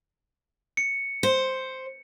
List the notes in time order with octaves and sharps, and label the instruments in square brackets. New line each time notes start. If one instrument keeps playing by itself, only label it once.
[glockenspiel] C#7
[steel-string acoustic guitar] C5